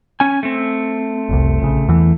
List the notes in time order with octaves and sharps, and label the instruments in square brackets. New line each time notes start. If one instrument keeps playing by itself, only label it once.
[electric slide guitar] C#4 G#5
A3 C4
[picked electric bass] F1 C2
A#1 C#3
E2 E3